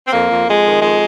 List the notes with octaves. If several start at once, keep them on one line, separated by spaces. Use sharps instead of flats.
C4
F2 A#3
F2
F2 G#3
D#3
F2 G#3